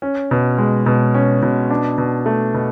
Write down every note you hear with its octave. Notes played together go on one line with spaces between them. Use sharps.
C#4
B2
G#3
B2
C#4
B2
D4
B2
A3
B2